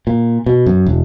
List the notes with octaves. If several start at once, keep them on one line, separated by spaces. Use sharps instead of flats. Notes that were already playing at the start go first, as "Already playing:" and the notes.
A#2
B2
F#2
E1